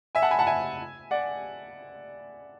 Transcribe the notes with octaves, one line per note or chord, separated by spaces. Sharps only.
E5 G#5
F#5 A5
G#5 B5
F#5 A5
E5 G#5
D5 F#5